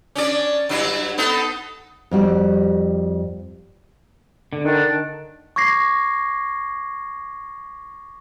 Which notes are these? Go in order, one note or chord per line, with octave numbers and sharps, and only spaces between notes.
C#4 D4 D5
G2 F#3 E4
B3 D#4 A4
F2 G3 F#4
D3
D#3 D4
C#6 D6 G#6 A#6 C7